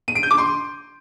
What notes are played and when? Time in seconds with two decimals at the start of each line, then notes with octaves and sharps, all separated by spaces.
0.08 D#7
0.15 D7
0.23 G6
0.31 D6
0.38 C6